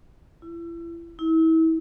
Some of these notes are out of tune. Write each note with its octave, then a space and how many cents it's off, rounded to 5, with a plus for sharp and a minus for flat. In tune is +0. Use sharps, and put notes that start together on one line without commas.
E4 +35
E4 -35